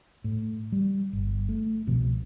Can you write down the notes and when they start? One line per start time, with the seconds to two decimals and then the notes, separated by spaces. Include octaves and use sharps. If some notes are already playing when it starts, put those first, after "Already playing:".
0.24 A2
0.72 G3
1.13 G1
1.49 A3
1.87 C2 B2 F3 C4